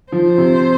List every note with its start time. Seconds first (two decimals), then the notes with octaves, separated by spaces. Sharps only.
0.12 F3 C5
0.38 C3